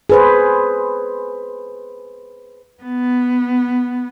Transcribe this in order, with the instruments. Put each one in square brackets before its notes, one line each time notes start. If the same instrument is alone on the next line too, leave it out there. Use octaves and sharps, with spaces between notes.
[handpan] G#4 B4 C5
[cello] B3